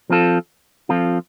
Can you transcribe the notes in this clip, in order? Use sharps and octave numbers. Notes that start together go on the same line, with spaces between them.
F3 C4 F4 A4
F3 C4 F4 A4